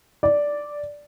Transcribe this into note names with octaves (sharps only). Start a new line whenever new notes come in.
D5